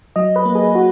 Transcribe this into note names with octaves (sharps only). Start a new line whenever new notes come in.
F#3 D#5
B4
A#3
G#4
F#4